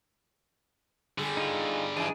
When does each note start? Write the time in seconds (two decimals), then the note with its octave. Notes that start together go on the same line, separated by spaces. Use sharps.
1.18 D3 G3 G#4
1.37 D#4 F4
1.97 G#2 E3 D4 G#4